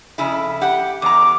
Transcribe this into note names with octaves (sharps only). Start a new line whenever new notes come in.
F2 C#3 E4
G4 F#5
E2 A#5 D6